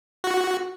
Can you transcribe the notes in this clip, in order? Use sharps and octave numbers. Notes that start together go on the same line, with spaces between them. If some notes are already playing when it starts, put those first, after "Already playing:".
F#4